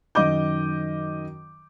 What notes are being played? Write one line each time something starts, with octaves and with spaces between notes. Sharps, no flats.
F#2 D#3 D#5 D6 G6